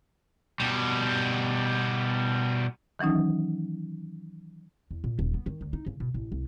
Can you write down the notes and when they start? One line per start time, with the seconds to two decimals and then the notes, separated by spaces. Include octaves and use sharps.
0.60 B2 G3
2.99 D#3 E3 F#3 C#4 D#4
4.91 E2
5.04 A#2
5.19 D#1
5.34 B3
5.46 D#3
5.61 D2
5.73 D#4
5.86 C#3
6.00 B2
6.14 A1
6.32 C2